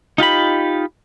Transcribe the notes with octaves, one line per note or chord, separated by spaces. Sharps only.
D#4 F4 G4 B5